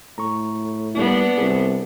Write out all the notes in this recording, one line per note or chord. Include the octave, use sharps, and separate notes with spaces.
A2 A#5 C#6
G3 A#3 B3 D4 E4
C2 G#4